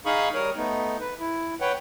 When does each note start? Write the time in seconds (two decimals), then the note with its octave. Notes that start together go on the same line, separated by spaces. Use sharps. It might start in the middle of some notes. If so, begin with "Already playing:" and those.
0.06 D#4 G#4 F5 B5 C#6 D#6
0.34 G3 A#4 C#5 D#6
0.56 A3 B3 D#4
1.00 B4
1.20 E4
1.61 B4 C#5 F#5 G5